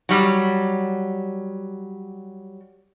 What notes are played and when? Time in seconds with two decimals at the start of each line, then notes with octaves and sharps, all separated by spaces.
0.09 F#3 G3